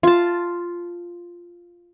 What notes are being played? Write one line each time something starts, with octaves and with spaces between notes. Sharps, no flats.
F4 A5